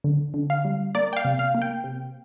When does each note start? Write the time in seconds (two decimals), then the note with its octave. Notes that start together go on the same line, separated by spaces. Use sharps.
0.04 D3
0.34 D3
0.50 F5
0.65 G3
0.95 A#3 D5
1.13 G5
1.17 F5
1.25 C3
1.39 F5
1.55 A#3
1.62 G5
1.84 C3